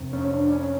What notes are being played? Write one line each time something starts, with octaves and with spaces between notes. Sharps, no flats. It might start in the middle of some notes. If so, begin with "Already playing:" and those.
Already playing: F2 C3
C#4
D4
C#4